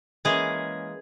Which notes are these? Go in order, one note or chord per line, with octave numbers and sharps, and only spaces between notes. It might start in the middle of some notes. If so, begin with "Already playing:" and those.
E3 G#3 A#3 C#4 G#4